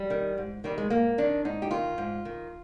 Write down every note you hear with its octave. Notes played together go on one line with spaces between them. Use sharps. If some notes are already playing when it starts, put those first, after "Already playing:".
Already playing: G3
D#3
G#2
D#3 G3
G#3
G#2 A#3
D#3 D4
G#2 D#4
G4
D#3 F4
G#2
D#3